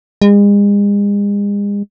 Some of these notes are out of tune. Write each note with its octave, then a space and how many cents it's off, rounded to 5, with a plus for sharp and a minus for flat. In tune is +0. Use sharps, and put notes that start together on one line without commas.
G#3 -40